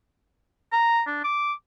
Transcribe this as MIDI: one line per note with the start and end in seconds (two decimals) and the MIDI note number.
0.72 1.01 82
1.07 1.22 62
1.24 1.53 86